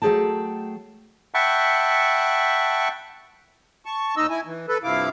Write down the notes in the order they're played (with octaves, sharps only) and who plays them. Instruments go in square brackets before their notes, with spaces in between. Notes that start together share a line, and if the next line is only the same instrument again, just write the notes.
[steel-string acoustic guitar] F#3 A3 C#4 G#4 G5 A5
[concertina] E5 F#5 G5 A5 B5 C#6
[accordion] A5 C#6
D#2 D#4 D#5 E6
E4 G#5
E3
A4 B4
G2 C3 F3 E4 F5 D6